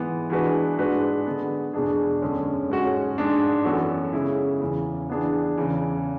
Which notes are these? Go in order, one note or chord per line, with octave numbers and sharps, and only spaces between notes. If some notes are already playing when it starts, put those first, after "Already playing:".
Already playing: G#2 E3 B3
E3 G#3 D4 F#4 B4
G#2 G#3 D4 F#4 B4
D3 G#3 B3
E2 B2 G#3 D4 G#4
F#2 D3 G#3 C#4 G#4
G#2 G#3 C#4 F#4
G#2 G#3 D4
F#2 E3 B3 F#4 A4
C#3 G#3 C#4 E4 G#4
E2 C#3 E3
E3 B3 D4 G#4
E2 C#3 E3